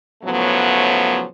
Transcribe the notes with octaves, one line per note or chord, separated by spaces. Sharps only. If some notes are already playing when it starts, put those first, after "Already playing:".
A2 C#3 F3 F#3 A3 B3